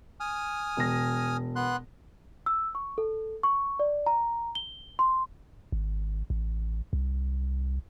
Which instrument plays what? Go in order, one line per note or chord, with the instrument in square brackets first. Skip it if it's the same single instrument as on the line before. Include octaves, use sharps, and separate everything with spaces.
[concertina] G#5 D#6 F6
[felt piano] E1 A#6
[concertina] B3 C6 F#6
[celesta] E6
C#6
A4
C#6
D5
A#5
G7
C6
[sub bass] G#1
A1
C2